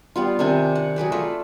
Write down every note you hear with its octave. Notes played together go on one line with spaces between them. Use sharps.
G3 B3 F4
C3 D#3 D4 G#5
F#5
F#3 G#4 B4 D5
A3 F4 B4 E5